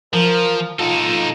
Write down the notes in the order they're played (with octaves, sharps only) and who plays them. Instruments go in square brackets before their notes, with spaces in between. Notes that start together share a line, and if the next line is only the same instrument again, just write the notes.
[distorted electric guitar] F3 [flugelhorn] A#4
[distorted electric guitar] D#4 A4 [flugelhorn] F4